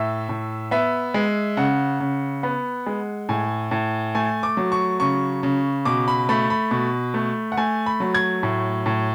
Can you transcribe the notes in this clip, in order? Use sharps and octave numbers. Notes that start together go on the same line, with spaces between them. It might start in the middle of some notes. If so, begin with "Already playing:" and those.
Already playing: A2 E5
A2
B3 E5
G#3
C#3 F#5
C#3
B3
G#3
A2 G#5
A2
A3 G#5
D6
F#3
C#6
C#3 C#6
C#3
B2 D6
B5
A3 B5
B5
B2
A3
F#5
A3 G#5
B5
F#3
G#6
A2
A2